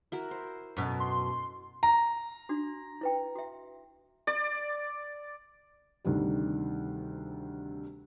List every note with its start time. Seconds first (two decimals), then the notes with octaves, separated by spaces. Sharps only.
0.12 E4 F#4 A#4
0.31 C5
0.77 F#2 B2
1.00 C6
1.83 A#5
2.49 D4 F#4
3.01 E4 B4 G5
3.35 F#4 E5
4.27 D5
6.05 D2 C3 D#3 G3